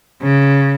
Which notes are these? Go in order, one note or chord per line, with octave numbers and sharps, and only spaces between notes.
C#3